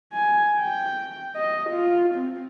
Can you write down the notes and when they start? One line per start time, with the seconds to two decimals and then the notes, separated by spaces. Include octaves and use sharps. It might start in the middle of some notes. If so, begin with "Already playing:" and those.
0.13 G#5
0.59 G5
1.36 D#5
1.70 F4
2.15 C4